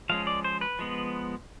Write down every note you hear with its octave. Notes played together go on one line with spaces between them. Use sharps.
F3 G#3 C#4 F5
D5
C5
B4
F3 G#3 B3